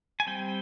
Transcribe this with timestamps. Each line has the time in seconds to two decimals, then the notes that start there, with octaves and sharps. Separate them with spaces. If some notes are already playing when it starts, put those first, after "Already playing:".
0.20 G#5
0.27 G3 C4 G5